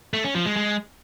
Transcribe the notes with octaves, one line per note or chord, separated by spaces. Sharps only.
A3
C#4
F3
G#3
G#3